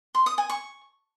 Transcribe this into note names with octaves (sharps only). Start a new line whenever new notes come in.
C6
D#6
G#5
C#6